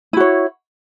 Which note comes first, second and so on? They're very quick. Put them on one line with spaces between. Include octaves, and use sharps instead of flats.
E4 F#4 C#5